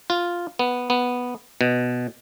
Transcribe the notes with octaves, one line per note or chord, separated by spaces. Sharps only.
F4
B3
B3
B2